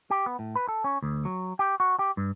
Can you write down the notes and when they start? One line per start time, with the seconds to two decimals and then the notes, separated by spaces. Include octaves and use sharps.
0.10 G4
0.26 B3
0.39 A2
0.56 B4
0.69 A4
0.84 C#4
1.02 D2
1.25 F#3
1.59 G4
1.80 F#4
1.99 G4
2.17 G2